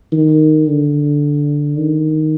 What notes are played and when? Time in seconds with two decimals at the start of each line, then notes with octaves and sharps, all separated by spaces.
0.12 D#3
0.68 D3
1.77 D#3